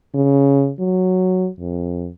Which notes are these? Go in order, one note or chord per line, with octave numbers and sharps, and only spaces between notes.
C#3
F#3
F2